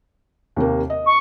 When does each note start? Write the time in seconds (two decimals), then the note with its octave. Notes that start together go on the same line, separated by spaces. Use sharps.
0.57 D#2 C3 A#3
0.90 D#5
1.06 C#6